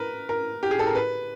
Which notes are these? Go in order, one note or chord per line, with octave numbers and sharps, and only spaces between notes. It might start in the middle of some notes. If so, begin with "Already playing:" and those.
Already playing: A#4 B4
A#4
G4
G#4
A4
A#4
B4